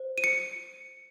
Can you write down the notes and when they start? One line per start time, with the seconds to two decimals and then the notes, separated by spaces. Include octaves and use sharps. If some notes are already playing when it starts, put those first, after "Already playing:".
Already playing: C5
0.18 D#7
0.24 C#7